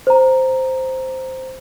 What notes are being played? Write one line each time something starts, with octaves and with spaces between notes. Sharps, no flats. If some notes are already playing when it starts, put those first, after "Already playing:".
C5 A#5